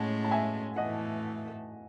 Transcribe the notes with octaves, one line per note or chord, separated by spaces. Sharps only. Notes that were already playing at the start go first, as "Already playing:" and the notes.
Already playing: A2 G#3 C#4 F#5 A5
A5
E5 G#5
A2 E3 A3 D#5 F#5